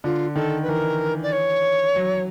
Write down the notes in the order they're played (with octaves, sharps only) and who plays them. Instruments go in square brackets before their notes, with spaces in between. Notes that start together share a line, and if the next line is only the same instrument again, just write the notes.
[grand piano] D3 [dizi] F4
[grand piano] D#3 [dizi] A4
[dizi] B4
[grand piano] E3 [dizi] A#4
[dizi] D5
C#5
[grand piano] F#3